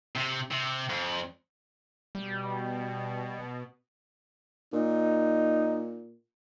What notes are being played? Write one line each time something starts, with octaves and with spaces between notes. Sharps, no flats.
C3
C3
F2
B2 G3
A#2 D#4